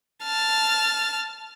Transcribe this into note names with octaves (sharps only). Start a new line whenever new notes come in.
A5 F6